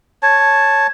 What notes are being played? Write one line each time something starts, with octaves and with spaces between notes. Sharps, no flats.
C#5 A5